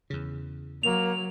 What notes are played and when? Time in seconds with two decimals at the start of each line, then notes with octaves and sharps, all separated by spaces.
0.10 E2 C#3
0.83 F#3 A#3 F7